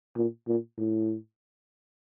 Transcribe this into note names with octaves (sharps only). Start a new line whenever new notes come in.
A#2
A#2
A2